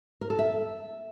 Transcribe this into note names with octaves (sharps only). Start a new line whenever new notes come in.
A#4
A4
E5